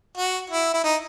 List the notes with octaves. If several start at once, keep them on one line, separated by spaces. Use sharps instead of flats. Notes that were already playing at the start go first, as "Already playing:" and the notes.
F#4
E4
E4
D#4